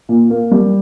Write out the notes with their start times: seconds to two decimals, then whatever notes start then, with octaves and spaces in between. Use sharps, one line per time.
0.09 A#2
0.30 A#3
0.51 G3